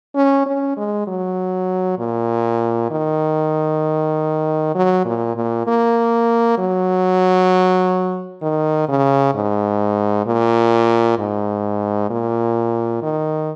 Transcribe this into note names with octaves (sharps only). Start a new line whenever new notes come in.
C#4
C#4
G#3
F#3
A#2
D#3
F#3
A#2
A#2
A#3
F#3
D#3
C#3
G#2
A#2
G#2
A#2
D#3